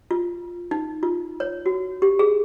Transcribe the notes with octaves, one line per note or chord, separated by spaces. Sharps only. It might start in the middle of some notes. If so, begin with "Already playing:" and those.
F4
D#4
F4
C#5
F#4
G4
G#4